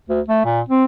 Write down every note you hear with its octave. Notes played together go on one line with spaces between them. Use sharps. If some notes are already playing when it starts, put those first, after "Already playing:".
D2
A3
A#2
C4